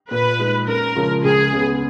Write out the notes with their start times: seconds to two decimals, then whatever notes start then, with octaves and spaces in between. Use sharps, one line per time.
0.11 A#2 B4
0.39 G#3 D#4
0.67 F#2 A#4
0.95 C#3 F3 G#3
1.24 C#2 G#4
1.53 C#3 G#3 B3